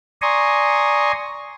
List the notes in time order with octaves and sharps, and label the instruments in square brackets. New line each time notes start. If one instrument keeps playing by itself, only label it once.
[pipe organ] D5 G#5 A#5 C6 C#6 D#6